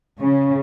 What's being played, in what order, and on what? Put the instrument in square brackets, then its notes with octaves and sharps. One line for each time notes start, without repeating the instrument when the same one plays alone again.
[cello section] C#3